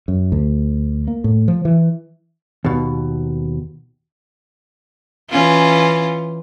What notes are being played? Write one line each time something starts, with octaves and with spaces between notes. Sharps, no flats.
F#2
D2
A#3
A2
F3
E3
D#2 B2
E3 C#4 F4